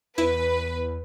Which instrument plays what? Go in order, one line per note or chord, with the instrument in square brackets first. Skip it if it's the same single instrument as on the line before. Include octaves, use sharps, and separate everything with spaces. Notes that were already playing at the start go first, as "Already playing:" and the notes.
[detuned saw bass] E2 [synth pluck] E4 [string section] B4